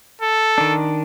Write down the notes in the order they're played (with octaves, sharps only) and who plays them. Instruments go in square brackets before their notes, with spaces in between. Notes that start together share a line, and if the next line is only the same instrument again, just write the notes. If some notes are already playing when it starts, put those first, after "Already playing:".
[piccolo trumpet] A4
[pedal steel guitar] D#3 D4